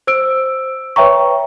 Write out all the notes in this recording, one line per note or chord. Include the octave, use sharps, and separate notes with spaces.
C5 E6 D7
B4 C#5 E5 G5 A#5 C#6